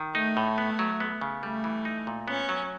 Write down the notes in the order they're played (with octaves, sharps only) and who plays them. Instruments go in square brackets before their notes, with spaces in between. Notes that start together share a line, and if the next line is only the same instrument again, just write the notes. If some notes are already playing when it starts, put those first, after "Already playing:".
Already playing: [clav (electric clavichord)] D#3
[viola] A3 [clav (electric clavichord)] D#4
[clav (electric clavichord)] A2
B3
F#3
B3
C#3
[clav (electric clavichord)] G3 [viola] A3
[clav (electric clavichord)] E3
D#4
A#2
[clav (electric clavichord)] B3 [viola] C#4
[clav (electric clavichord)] F#3